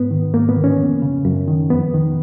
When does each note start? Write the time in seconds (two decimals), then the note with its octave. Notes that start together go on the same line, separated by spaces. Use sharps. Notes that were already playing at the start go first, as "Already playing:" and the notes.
Already playing: G#2 B3
0.11 D#3
0.34 G#2 A#3
0.49 B3
0.56 D#3
0.64 C#4
0.79 F2
1.02 C#3
1.25 F#2
1.48 D#3
1.70 F2 B3
1.94 D#3